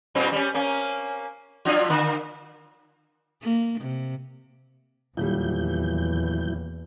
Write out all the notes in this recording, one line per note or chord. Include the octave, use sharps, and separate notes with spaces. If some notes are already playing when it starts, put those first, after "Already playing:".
F#2 A#2 C4
G3 C#4
A#3 C#4
F3 D4 F4
D3 A#3
A#3
C3
D#1 E2 F#3 G3 E4 G6